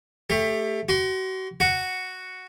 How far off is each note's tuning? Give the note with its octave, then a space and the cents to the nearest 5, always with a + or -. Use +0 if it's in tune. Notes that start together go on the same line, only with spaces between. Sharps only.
A3 +0 G4 +25
F#4 +35 C6 -10
F#4 +0 F#5 +0